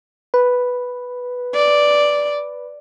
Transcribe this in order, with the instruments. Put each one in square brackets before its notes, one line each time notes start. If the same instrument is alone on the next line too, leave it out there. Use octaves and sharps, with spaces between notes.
[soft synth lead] B4
[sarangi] D5